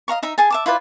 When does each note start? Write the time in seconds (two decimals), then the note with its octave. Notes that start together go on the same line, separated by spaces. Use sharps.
0.08 D#5 F5 A#5 C#6
0.23 D#4 E5 A#5
0.38 G#4 G#5 A5
0.50 E5 A5 D6
0.66 E4 F4 B4 D5